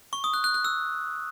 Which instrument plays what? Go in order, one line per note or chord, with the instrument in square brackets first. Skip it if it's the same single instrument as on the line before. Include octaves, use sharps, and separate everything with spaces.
[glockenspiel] C#6
D#6
F#6
F#6
F#6
E6